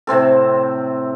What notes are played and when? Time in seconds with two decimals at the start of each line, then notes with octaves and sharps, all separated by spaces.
0.07 A2 C3 C4 A4